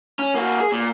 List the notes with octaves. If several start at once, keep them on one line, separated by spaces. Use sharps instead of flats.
C#4
A#3 F#4
G#4
A#2